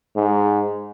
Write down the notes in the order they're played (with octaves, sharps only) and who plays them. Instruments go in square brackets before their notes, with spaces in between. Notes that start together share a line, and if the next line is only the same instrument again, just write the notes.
[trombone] G#2